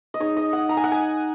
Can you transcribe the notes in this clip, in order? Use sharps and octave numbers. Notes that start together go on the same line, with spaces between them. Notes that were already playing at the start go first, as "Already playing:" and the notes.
D#5
G#3 D#4 C#5
D#5
F#5
A#5
G#5
F#5
G#5